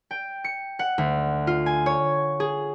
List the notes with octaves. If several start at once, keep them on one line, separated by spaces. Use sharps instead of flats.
G5
C#7
F#5
D2
F4
G#5
C#5
G#4